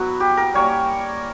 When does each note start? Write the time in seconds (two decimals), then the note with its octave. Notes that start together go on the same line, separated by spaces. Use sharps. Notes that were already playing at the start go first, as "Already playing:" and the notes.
Already playing: F#3 B3 E4 F#4
0.20 G4
0.37 A#4
0.54 G3 A#3 C#4 C#5